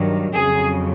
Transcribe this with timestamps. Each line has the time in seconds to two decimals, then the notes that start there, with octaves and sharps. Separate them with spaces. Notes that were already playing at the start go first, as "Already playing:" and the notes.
Already playing: G2 D#3 F#3
0.35 F2 C#3 F#3 G#4